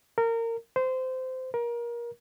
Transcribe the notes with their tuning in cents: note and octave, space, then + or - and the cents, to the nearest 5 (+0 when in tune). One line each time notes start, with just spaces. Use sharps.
A#4 -25
C5 -20
A#4 +25